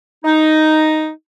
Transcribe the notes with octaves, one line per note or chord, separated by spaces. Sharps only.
D#4